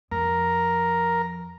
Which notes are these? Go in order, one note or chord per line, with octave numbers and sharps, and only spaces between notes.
F2 A#4